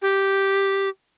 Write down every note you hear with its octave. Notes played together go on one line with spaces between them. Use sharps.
G4